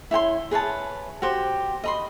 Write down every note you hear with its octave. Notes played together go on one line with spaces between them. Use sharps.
E4 C#5 G5 C6
G#4 B4 C#5 A5
F#4 G4 C5
D#5 B5 C6